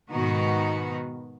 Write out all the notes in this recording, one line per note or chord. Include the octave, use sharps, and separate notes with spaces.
G#2 B2 D#3 B3 D#4 F#4